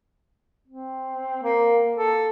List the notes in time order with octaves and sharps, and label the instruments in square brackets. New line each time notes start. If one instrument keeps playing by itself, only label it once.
[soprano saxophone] C4
A#3
A4